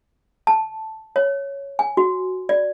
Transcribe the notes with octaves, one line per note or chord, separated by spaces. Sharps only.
A5
C#5
G#5
F#4
D5